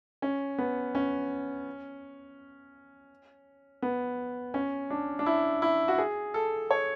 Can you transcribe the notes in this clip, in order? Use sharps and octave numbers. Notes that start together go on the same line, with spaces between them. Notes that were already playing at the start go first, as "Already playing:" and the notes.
C#4
B3
C#4
B3
C#4
D4
D4
E4
E4
F#4
G#4
A4
C#5